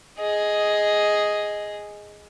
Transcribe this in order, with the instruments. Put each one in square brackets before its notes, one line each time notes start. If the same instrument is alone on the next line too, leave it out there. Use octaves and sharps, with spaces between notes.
[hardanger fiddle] G#4 D#5